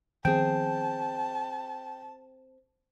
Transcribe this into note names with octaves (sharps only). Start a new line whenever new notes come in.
D#3 F3 B3 C4 G#4 G5 A5